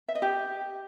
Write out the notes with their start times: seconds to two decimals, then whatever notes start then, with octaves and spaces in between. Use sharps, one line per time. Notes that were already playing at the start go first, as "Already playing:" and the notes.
0.08 E5
0.15 D#5
0.22 G4